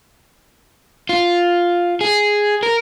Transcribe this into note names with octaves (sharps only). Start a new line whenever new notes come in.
F4
G#4
A#4